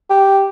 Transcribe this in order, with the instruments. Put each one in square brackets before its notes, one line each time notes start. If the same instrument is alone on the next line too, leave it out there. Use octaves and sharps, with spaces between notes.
[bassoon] G4